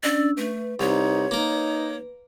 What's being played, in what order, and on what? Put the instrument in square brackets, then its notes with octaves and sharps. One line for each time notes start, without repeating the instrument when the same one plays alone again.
[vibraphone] C#4 D4 E6 [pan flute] D5
[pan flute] A3 [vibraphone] B4
[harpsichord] C2 [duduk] D#4 [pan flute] C#5
[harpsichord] A#3 A#4 [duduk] D#4